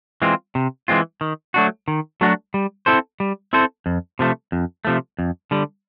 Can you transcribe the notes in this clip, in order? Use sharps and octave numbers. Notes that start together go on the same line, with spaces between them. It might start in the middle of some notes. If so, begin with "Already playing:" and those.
E3 G#3 C4 F4
C3
E3 G#3 C4 F4
D#3
F#3 A3 D4 F#4
D#3
F#3 A3 D4 F#4
G3
C4 E4 A4 C5
G3
C4 E4 A4 C5
F2
C3 F3 A3
F2
C3 F3 A3
F2
D3 G3